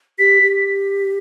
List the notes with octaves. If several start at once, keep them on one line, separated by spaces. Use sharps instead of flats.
G4 B6
G4